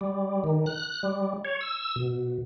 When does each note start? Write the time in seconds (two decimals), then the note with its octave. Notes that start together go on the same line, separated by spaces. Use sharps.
0.01 G3
0.44 D#3
0.66 F#6
1.03 G3
1.45 C#5
1.61 E6
1.96 B2